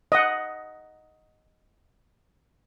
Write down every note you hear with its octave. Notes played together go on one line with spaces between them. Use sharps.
D#5 F#5